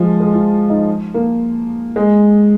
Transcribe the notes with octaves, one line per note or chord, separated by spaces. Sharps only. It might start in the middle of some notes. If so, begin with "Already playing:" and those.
Already playing: F3 G#3
G#3
F4
D#4
A#3
G#3